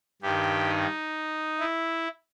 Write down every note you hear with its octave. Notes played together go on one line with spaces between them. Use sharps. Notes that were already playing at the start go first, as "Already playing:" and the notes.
G2 D#3 G4
D#4
E4